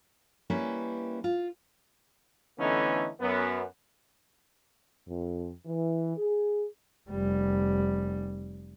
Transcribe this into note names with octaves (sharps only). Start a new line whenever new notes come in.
G3 A#3 C#4 E4 B4
F4
D3 E3 A3 B3 C#4 D#4
F#2 B3
F2
E3
G#4
F1 G3